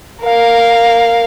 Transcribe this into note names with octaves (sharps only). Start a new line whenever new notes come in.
A#4 F5